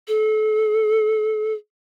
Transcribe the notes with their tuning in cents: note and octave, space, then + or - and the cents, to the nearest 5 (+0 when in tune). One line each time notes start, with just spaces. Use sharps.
A4 -30